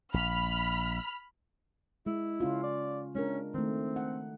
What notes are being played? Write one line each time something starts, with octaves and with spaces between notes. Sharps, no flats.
A#1 B5 F6
G#3 E4
C#3 C#4 F4
D5
G#3 C#4 D4 A#4
D#3 A3 C4
F#5